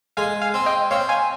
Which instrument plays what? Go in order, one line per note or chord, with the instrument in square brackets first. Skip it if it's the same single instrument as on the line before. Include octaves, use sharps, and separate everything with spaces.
[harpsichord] G#3 [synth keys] F5 G#5
[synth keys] F5 G#5
[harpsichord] C4
[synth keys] D#5 G5
[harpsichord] C4 [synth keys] C#5 F5
[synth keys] F5 G#5